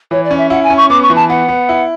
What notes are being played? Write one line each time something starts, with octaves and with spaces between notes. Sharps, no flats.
E3 C#5
D5
C#4
E5
E4 F#5
G#5
C#4
C#6
B3 D6
C#6
E3
A5
B3 F#5
B3
E4